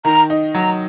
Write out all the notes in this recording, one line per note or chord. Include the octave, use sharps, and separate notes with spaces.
D#3 A#5
D#4
F#3 A#5